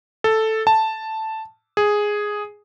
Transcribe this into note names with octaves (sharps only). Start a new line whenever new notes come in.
A4
A5
G#4